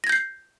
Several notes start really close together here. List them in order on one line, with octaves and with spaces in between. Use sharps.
A#6 G#6 G6 C7